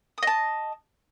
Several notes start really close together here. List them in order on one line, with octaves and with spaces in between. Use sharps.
D#6 D#5 A5